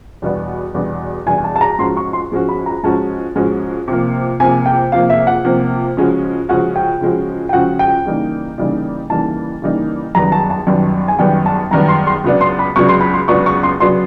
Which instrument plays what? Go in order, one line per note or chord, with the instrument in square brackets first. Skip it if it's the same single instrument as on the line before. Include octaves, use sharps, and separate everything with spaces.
[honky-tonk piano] E2 B2 G3 B3 D4
E2 B2 G3 B3 D4
[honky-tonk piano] E2 B2 G3 B3 D4 [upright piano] G#5
[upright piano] A5
A5
A#5
[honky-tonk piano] G#2 F3 G#3 C#4 F#4 [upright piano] C6
[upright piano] C#6
C6
[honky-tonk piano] G#2 F3 G#3 C#4 F#4
[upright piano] B5
A#5
[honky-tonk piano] G#2 F3 G#3 C#4 F#4 [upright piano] A5
[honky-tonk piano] G#2 F3 G#3 C#4 F#4
C3 F3 A#3
[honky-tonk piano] C3 F3 A#3 [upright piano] G#5
[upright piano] G5
[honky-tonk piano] C3 F3 A#3 [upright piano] F5
[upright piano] E5
F#5
[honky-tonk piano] C3 F3 A#3
C#3 F3 G#3 C#4 F#4
[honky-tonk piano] C#3 F3 G#3 C#4 F#4 [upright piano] F#5
[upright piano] G5
[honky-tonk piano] C#3 F3 G#3 C#4 F#4
[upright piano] G5
[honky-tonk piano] C#3 F3 G#3 C#4 F#4 [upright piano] F#5
[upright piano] G5
[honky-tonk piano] C#3 E3 G3 A#3 D#4
C#3 E3 G3 A#3 D#4
[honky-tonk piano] C#3 E3 G3 A#3 D#4 [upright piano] A5
[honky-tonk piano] C#3 E3 G3 A#3 D#4
[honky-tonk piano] F#2 D#3 G3 B3 [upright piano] A#5
[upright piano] A5
A5
[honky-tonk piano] F#2 D#3 G3 B3
[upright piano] G#5
[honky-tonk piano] F#2 D#3 G3 B3 [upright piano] G5
[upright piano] A5
[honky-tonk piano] F#2 D#3 G3 B3 [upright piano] A#5
[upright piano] C6
C6
[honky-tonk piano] C#2 C#3 F#3 B3 D4
[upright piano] C6
B5
[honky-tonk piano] C#2 C#3 F#3 B3 D4 [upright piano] C#6
[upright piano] C6
B5
C6
[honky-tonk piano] C#2 C#3 F#3 B3 D4 [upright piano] C#6
[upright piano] C#6
C6
[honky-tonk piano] C#3 F#3 B3 D4 [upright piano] C6